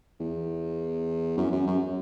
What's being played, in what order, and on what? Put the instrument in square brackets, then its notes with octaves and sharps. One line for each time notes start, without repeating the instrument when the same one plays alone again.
[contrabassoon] E2
F#2
F#2
F#2